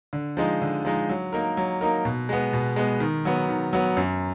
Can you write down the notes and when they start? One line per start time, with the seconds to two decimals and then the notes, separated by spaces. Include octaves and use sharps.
0.13 D3
0.37 F3 G#3 D#4
0.62 D3
0.85 F3 G#3 D#4
1.09 F#3
1.33 A#3 D#4 A#4
1.57 F#3
1.81 A#3 D#4 A#4
2.05 B2
2.29 G#3 B3
2.53 B2
2.76 G#3 B3
3.00 D#3
3.25 F#3 B3
3.49 D#3
3.73 F#3 B3
3.97 F#2